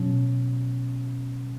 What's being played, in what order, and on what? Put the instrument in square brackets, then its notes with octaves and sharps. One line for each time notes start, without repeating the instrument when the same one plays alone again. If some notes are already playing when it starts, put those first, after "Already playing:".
Already playing: [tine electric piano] B2 F#3 C#4